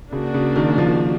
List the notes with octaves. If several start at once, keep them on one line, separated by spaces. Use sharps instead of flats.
C#3 A#3 D4 F#4
C#3
D#3
F3